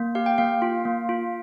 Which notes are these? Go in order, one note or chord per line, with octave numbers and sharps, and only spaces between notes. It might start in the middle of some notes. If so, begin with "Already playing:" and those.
Already playing: A#3
G4 F5
G5
A#3 F5
F4
A#3
F4